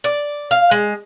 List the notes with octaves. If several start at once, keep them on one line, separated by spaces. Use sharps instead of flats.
D5
F5
G#3